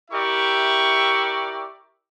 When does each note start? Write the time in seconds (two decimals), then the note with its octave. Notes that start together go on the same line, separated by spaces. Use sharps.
0.11 E4 G4 A#4 D5 E5 C#6